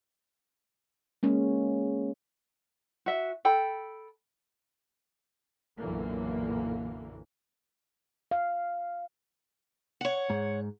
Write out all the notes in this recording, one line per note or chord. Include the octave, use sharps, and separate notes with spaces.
G#3 A#3 C#4
F#4 E5
A4 G5 B5
B1 F#2 A#2 D3 E3 A#3
F5
C#5 F#5
G#2